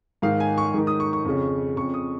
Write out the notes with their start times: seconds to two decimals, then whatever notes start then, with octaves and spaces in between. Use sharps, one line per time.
0.22 G#2 D#3 F5
0.40 G#5
0.58 C#6
0.74 G#2 D#3
0.87 D#6
1.00 C#6
1.13 C#6
1.25 F2 C#3
1.77 F2 C#3 C#6
1.94 D#6